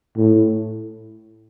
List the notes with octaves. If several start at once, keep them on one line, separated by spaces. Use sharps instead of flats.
A2